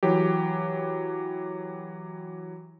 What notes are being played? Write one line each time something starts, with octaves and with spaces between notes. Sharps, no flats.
E3 F#3 G4